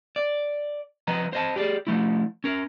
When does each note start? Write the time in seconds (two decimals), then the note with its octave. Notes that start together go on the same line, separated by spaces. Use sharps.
0.16 D5
1.07 F3 B4 D#5 A#5
1.33 C5 D#5 A5
1.56 G4 G#4 D5
1.87 F3 A3 E4
2.44 C#4 A#4